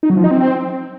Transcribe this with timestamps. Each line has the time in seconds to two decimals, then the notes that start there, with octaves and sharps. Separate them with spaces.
0.03 D#4
0.10 F#3
0.17 F3
0.24 D#4
0.31 C4